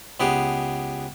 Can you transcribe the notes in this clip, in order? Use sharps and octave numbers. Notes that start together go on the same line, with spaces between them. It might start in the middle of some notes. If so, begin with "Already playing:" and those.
C#2 B3 G4 G#4